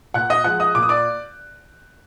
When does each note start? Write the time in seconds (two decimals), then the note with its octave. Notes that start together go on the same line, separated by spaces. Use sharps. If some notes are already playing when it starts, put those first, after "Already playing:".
0.14 A#2 F#5 F#6
0.30 D#5 D#6
0.44 F3 G#3 F#5 F#6
0.60 D#5 D#6
0.75 A#2 D6
0.83 D#6
0.89 D5 D6